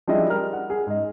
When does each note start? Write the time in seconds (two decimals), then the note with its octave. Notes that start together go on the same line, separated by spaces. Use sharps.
0.07 F3 G3 D4 E4 G#4 D#5
0.29 G3 A#4 F6
0.53 F#5
0.70 G#4
0.87 G#2 D#5